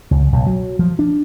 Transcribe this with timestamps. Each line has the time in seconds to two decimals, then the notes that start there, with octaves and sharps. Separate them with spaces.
0.11 C#2
0.32 B1
0.46 F#3
0.79 F3
0.99 D4